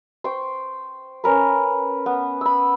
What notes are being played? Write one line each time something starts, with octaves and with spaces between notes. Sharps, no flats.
C5 G5 C#6
C#4 A#4 B4
B3
B5 E6